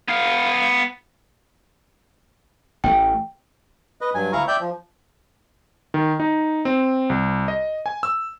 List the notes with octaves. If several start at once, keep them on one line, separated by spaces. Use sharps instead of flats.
B3 F5
A1 A3 G5
B4 D#5
G2 F#3 G#5
D2 E4 F5 A#5 C#6
D5 E5 G5 G6
F3
D#3
D#4
C4
C2
D#5
G#5
E6